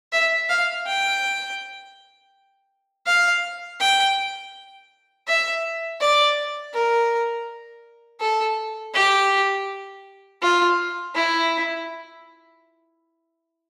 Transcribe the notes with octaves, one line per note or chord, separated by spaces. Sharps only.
E5
F5
G5
F5
G5
E5
D5
A#4
A4
G4
F4
E4